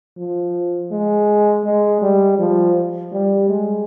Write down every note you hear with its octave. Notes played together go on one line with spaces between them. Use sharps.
F3
G#3
G#3
G3
F3
G3
G#3